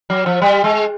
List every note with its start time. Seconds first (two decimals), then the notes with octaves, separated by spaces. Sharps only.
0.10 F#3
0.26 F3
0.42 G3
0.64 G#3